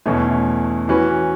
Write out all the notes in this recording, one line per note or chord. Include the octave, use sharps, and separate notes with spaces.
E2 B2 A3 C#4 E4
E3 C#4 F#4 B4